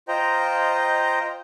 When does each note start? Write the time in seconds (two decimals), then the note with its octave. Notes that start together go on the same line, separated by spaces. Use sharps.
0.08 F4 C5 D#5 G5 A#5